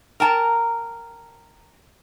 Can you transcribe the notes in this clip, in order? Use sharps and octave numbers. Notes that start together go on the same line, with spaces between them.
A#4 G5 A5 A#5